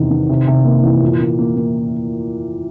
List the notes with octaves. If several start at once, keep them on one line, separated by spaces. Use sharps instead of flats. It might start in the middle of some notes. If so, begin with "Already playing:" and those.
Already playing: E2 C3 D#3
D#3
C3
C3
A#3
E3
A#2
A#3
A#3
A#3